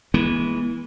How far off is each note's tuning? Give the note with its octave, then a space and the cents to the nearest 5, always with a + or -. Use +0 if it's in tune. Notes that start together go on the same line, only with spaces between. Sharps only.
E3 -10 G#3 +0 B3 -45